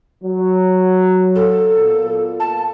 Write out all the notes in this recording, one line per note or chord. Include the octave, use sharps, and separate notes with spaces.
F#3
A4
A#2 A#3 B3
A5